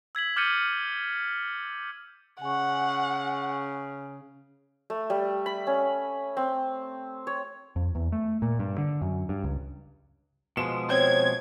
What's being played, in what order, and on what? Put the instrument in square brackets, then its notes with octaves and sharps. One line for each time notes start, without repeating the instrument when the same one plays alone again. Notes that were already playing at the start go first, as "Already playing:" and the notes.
[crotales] E6 G#6 B6 F#7
D6 F6 G6 A6 C#7 D#7
[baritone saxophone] C#3 [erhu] F#5 [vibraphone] G#5 C#6
[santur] A3
G3
B5
C#4
C4
C#5
[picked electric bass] F2
E2
A3
A#2
G2
D3
F#2
G2
C#2
[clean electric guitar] B2 F3 G#3 [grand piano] E7
[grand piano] C4 [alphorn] C#5 [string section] G#6